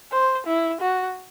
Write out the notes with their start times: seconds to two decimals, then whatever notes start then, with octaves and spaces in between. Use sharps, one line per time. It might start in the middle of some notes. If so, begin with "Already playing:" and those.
0.12 C5
0.47 E4
0.81 F#4